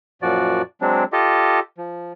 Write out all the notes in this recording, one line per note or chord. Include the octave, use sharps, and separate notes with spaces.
F#2 A#2 F3 F#4 D5
F#3 G#3 C4 D4
F4 G4 A4 D#5
F3